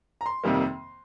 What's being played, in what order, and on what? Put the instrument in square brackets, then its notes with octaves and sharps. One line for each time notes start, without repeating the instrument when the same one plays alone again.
[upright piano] A#5
C6
F2 C3 D#3 G3 A#3